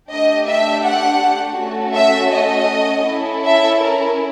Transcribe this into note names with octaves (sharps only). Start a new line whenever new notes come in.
A3 D4 G4 D#5
E5
F#5
A3 C#4 F#4 A4
E5
D#5
C#4 E4 A4
E5
A#4